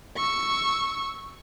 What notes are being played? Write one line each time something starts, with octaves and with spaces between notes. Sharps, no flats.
C#6 E6